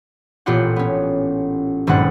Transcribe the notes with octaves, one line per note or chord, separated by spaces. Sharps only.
A1 A#2 B3 F4 G4 F#5
B3 C#4
D#1 G#1 G2 G#3 F#5 A6